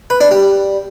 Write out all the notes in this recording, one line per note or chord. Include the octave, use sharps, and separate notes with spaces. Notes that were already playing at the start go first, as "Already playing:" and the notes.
B4
D4
G3